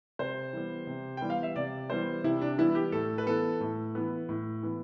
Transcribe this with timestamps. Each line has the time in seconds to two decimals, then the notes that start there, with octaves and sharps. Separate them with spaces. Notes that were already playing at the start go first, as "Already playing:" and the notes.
0.19 C3 C5
0.53 E3 G3 B3
0.87 C3
1.17 E3 G3 B3 G5
1.30 F5
1.43 E5
1.56 C3 D5
1.90 E3 G3 B3 C5
2.24 C3 E4
2.41 D4
2.58 E3 G3 B3 E4
2.75 G4
2.92 A2 A4
3.18 B4
3.27 E3 B3 A4
3.60 A2
3.95 E3 B3
4.29 A2
4.63 E3 B3